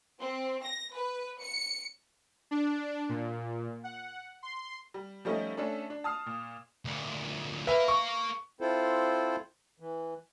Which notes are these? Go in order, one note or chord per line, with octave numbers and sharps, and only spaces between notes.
C4
A#6
B4
C#7
D4
A#2
F#5
C6
G3
F3 G3 A3 C#4 D#4
A3 C#4 D4 A4
D4
A5 D#6 F6 C7
A#2
D2 A#2
A#4 B4 E5 F5
C#6
C4 E4 F4 A4 C5
E3